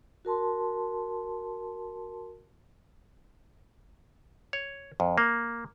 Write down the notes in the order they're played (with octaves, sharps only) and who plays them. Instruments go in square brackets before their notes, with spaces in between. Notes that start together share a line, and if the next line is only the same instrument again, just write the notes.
[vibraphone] F#4 A#4 A5 C6
[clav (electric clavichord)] C#5
F2
A#3